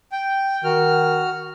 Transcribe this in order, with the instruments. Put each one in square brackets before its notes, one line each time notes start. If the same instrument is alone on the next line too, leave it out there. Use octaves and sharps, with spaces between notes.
[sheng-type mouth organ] G5
[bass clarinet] D#3 [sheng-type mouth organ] F#4 F6